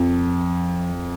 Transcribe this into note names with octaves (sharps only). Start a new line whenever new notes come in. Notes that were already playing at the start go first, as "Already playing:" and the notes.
Already playing: F2 F3